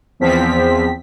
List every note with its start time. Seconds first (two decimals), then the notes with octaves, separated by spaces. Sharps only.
0.20 E2 F3 C4 B6